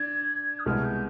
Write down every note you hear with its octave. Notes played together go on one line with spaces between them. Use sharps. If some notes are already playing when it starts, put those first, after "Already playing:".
Already playing: D4 G#6
D#6
C2 B2 G#3 F6
G6